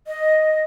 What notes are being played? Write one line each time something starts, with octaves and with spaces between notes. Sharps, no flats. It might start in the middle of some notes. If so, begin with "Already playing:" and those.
D#5